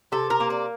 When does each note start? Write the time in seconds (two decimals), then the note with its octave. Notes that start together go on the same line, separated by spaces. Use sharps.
0.12 C3 A4
0.30 A#4
0.40 A#3
0.50 D5